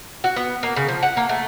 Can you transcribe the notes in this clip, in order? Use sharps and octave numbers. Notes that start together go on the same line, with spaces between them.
F#4
B3
A#3
C#3
F3
F#5
A#3
A3